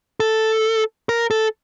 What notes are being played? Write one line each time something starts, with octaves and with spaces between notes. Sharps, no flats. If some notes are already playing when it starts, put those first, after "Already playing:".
A4
A#4
A4